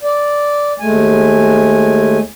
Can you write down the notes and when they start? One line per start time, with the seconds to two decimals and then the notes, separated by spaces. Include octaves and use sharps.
0.03 D5
0.80 D#2 G#3 A3 G#5